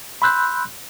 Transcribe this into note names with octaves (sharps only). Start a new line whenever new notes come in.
B5 C6 E6 F#6 G6